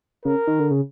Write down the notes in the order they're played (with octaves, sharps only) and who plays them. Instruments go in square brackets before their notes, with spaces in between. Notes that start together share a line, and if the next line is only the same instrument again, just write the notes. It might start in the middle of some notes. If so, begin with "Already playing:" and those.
[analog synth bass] C#3 [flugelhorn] A#4
[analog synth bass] D#3
D3
C#3